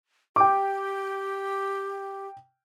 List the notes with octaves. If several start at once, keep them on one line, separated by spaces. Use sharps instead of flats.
G4 G5 D6